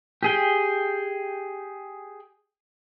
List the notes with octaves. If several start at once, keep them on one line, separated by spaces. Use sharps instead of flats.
G4 G#4 G5